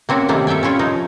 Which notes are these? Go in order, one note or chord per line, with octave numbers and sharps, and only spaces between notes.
A#3 C4 C#4 F#4
C3 D#3 A3 A#3 D5
A4 E5 F5 G5 G#5
C#4 E4 F4 C#5 F5
F3 D#4